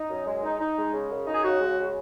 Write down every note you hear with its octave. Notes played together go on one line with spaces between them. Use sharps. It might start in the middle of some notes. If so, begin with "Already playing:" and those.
Already playing: D#4
F#2
G#3
D#4
D#4
G#3
C#3
F#2
D#4
G#4
C#3 F#4
G#3
C#3